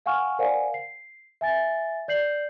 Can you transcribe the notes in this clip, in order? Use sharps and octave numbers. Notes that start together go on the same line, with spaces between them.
F5 F#5 G#5 C#6 F6
A#4 C5 D5 F5 F#5 G#5
C7
E5 G#5 A6
D5 G6 C7 F#7